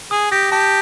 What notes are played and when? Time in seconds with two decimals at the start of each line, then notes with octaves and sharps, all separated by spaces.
0.11 G#4 D#6
0.31 G4 A#6
0.51 G4 A5